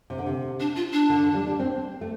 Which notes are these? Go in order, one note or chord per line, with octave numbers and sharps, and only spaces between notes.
C3
D3
C3
D4
F4
D4
D3
D3
G3
D4
C4
A3